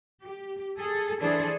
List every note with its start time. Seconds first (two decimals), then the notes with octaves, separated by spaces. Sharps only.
0.23 G4
0.80 G#4 A4
1.22 E3 D4 G#4 A4 C5 D5